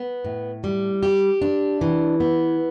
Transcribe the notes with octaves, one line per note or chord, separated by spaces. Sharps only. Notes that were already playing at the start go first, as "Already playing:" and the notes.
Already playing: B3
A2
G3
G4
D4
E3
B3